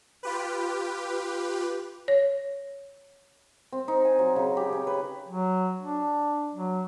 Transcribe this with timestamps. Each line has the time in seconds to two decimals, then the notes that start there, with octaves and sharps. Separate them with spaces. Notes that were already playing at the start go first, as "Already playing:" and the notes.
0.23 F4 G4 B4
2.08 C#5
3.73 C4
3.88 D#4
4.05 G#5
4.19 F#3
4.36 C#3
4.57 G4
4.73 C#4
4.87 B4
5.28 F#3
5.80 D4
6.54 F#3